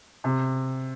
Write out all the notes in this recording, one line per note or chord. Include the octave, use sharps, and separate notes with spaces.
C3